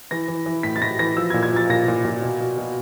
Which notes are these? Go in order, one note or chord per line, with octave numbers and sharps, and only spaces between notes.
E3 A#6
E3
E3
A2 B6
A6
A2 A#6
E3 A#6
F3 E6
G#6
A#2
G#6
F3 A6
A#2 A#6
A#2
A#2
B2
B2
B2